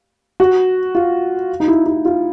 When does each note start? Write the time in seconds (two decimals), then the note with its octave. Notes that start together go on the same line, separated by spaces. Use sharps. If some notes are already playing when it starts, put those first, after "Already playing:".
0.40 F#4
0.95 F4
1.60 D#4
1.68 E4
1.86 E4
2.05 F4